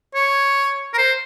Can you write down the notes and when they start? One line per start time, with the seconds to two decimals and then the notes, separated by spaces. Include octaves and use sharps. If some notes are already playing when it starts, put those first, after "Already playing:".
0.15 C#5
0.94 A#4
0.98 C5